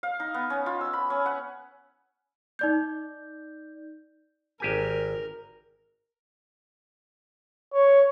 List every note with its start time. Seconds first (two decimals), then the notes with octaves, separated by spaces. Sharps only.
0.03 F5
0.20 D#4
0.34 B3
0.50 C#4
0.66 F4
0.81 E6
0.93 B5
1.10 C#4
1.26 F#5
2.59 D#4 D5 G6
4.60 G#1 G4 A#4 G#5
7.73 C#5